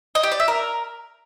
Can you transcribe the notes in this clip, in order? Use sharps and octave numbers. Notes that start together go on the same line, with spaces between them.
D#5
G4
D5
E5
A#4